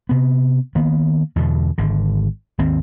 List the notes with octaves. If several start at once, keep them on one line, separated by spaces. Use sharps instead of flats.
C3 B3
D#3 A#3 B3
E2 B2 D3
G#1 D3
G#1 D#2 C4